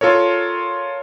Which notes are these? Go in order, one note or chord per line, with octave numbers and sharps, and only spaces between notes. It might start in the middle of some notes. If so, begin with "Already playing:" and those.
F4 A4 A#4 C#5